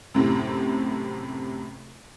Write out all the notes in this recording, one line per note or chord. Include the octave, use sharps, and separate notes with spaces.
F#2 A2 C3